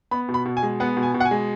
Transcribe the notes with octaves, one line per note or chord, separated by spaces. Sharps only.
B3 B5
B2
B5
B2
G#5
G#3
B3 F#5
B2
G#5
B2
F#5
G#5
G#3